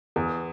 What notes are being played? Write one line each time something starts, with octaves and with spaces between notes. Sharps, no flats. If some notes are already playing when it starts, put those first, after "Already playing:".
E2